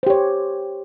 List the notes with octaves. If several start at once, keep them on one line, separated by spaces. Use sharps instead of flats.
G4 C5 C#5